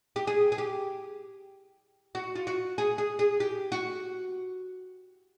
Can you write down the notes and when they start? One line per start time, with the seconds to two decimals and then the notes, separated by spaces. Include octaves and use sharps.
0.16 G4
0.27 G#4
0.52 G#4
0.58 G4
2.15 F#4
2.35 F4
2.47 F#4
2.78 G#4
2.98 G#4
3.19 G#4
3.40 G4
3.72 F#4